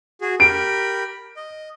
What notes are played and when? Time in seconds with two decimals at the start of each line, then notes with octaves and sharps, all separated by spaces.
0.21 F#4 G#4
0.40 G4 A#4 B5 D7
1.37 D#5